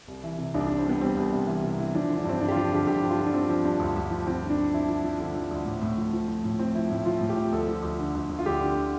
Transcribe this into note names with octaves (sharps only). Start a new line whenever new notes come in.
C2
E3
C3
C2 D4
C2 D4
C4
G3 B3
G3 C4
C2
C3
E3
C3
E3
F3 D4
D3
D4
G2 C4
G2 D4
G4
F3 F4
D3 G4
G2 G4
F3
F4
D3
D4
F3 C4
F3
G2
D2
D2
F3
F3 C4
D3
D4
D3
F3 E4
F3
F3
D3
F3
D2
A2
A2
F3
F3
F3
A2
F3 C4
F3 E4
A2 E4
F3 F4
A2
G4
F3
D2 A4
F3
D2
D3
D2
D2
F4
D2 G4
D3